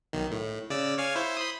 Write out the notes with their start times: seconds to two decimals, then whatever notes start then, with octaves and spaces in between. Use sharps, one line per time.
0.13 B1 D#3
0.32 A2
0.70 C#3 D5 E6
0.98 C#5 F5 G#5
1.16 E4 C5
1.37 B5 C6 D#6